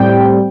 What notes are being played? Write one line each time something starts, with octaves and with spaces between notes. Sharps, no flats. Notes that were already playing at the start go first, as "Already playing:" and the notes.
Already playing: A2 G3 C4 G5